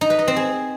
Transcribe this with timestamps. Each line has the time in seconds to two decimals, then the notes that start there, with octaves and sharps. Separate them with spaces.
0.01 D#4
0.10 B4
0.19 D#5
0.28 C4
0.36 G#4